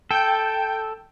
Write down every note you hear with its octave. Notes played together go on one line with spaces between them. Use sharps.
A4 G5 G6